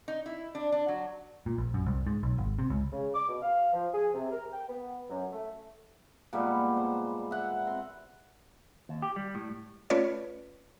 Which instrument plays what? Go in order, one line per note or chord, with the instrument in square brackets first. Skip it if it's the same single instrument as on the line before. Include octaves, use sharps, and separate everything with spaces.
[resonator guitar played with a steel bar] D#4
E4
D4
D4
F#3
[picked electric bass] A#2
A#1
F#2
C2
G#2
B1
G#1
C3
C#2
[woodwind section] C#3
D6
B2
F5
F3
G#4
C3
A#4
G5
B3
F#2
A3
[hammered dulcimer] A#2 G3 G#3 B3
C5
E5 F#5
C4 C6
[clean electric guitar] D#2
G4
G3
A2
[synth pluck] A3 C#4 F4 B4 C#5 D5